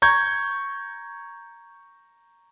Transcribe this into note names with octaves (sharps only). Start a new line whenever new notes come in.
A#5 C#6 G6 G#6